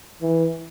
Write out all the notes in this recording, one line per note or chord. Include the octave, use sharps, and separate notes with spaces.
E3